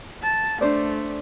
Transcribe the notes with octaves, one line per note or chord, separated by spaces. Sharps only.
A5
A3 D4 C5 D5